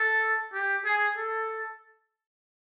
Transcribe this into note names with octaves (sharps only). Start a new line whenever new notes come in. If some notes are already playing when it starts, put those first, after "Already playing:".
Already playing: A4
G4
G#4
A4